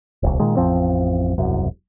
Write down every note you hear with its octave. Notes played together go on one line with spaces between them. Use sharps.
D#1 C2
A#2 D#3 G#3
A1 F2 F3 C4
E1 C2 F#2